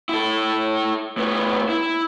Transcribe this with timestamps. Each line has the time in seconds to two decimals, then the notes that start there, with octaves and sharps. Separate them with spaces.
0.09 E4 A4
1.17 A2 B3
1.69 E4